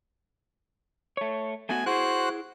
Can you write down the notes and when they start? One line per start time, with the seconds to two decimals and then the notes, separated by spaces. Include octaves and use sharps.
1.17 A3 C#5
1.69 A3 B3 F#4 G#5
1.86 E4 F#4 G#4 C5 F#6